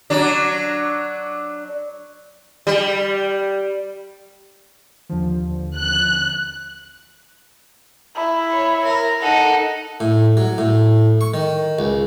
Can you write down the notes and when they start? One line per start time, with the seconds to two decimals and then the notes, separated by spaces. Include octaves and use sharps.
0.10 F#3 D4
2.67 G3
5.09 D#2 D3 F3
5.76 F#6
8.15 E4
8.51 C#5
8.84 A#4
9.22 D#4 A4 F#5
10.00 A2
10.37 F#3
10.58 A2
11.21 C#6
11.34 D#3
11.79 C#2